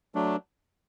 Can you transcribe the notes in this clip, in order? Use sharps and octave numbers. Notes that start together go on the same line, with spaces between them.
F#3 A3 D4